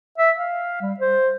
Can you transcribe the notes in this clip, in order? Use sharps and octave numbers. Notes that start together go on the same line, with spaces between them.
E5
F5
G3
C5